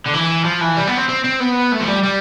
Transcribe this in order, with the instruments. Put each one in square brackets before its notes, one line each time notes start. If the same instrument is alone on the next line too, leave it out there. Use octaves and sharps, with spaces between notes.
[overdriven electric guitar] D3
E3
F3
E3
G3
B3
C4
C4
C4
B3
A3
F3
G3
G3